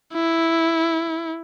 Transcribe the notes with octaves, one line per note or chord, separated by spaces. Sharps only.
E4